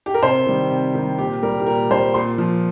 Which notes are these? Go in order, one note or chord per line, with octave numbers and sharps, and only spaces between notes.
G4
A#4
C3 C5
D#3 G3
C3
D#3 G3
A#2 G4
G3 A#4
G4
A#2 A#4
G3 C5
A#2 C6
F3